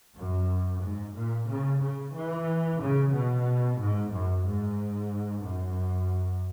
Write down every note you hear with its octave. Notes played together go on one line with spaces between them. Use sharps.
F#2
G#2
A#2
C#3
C#3
E3
C#3
B2
G#2
F#2
G#2
F#2